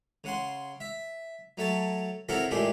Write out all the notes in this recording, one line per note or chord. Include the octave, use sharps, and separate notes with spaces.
C#3 F#5 C6
E5
F#3 A3 C#5 A5
C4 E4 F#4 A4 A#4 C#5
A1 A#2 G#3 A3 G4 G#4